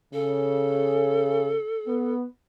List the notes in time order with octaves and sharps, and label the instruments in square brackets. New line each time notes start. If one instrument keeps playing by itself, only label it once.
[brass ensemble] C#3 [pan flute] A4
[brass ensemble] B3